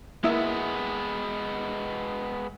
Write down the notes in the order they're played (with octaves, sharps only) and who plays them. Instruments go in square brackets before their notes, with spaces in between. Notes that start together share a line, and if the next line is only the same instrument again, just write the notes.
[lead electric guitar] G#3 B3 [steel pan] A#3 E4 E5